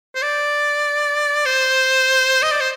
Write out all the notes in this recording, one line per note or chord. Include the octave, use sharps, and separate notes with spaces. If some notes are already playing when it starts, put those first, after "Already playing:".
C5
D5
C5
D#5
D5
C5